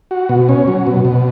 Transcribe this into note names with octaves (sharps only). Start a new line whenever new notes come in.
F#4
B2
C#4
F#3
B2
B2